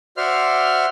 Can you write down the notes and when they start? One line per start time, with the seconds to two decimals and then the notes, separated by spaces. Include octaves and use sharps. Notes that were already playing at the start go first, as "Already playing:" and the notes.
0.17 F#4 C5 D5 E5 C6 F6